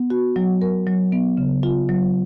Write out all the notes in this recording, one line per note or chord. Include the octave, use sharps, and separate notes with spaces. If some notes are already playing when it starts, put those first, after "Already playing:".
Already playing: B3
F#4
F#3
A#4
F#3
B3
C#3
F4
F#3